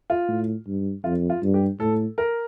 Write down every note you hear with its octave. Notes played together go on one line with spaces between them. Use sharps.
F4
A2
G2
F2 F4
F4
G2
G4
A2 A4
A#4